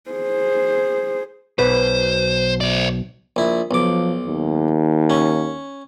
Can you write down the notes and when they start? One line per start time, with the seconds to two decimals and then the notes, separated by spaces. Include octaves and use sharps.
0.11 G#4 C5
1.59 B1 B2 B4 C5
2.61 C5 D5
3.36 A#1 E4
3.71 B1 F3 D6
4.27 D#2
5.10 C#4